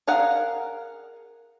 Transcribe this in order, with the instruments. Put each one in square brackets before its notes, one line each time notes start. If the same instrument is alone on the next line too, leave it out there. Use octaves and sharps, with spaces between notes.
[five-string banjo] G#4 A#4 F5 F#5